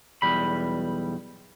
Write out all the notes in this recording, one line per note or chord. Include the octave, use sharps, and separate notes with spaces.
B1 E2 G3 B5